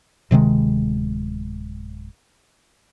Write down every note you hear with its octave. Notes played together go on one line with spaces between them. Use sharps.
D1 C3 D#3 G#3